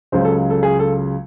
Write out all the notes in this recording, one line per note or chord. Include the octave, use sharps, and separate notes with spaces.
C#2 C#3 F#3 C5
A4
A4
G#4
A4